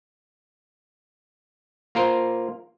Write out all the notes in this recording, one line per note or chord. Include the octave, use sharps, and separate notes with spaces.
A#3 F4 A#4 C5